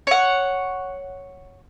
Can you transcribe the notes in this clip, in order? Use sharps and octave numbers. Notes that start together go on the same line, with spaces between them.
C#5 F#5